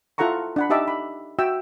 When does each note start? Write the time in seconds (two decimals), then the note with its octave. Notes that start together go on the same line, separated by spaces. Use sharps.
0.18 E4 F4 A4 F#5 A#5 C#6
0.56 D4 F#5 B5
0.70 D#4 G4 D#5 E5 A5 D6
0.88 B5
1.39 F#4 E5 G5 E6